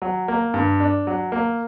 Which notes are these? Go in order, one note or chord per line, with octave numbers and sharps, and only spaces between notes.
F#3
A#3
G2
D4
F#3
A#3